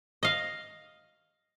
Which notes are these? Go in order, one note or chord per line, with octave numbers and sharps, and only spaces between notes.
D#5 F5